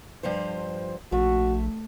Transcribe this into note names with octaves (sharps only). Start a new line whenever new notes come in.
G2 F3 C5
A#1 A3 F#4